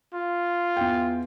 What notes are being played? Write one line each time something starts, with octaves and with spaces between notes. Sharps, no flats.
F4
E2 G5